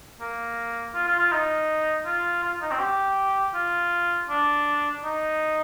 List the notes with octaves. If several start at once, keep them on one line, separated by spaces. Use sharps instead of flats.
A#3
F4
F4
F4
D#4
F4
F4
D#4
C4
G4
F4
D4
D#4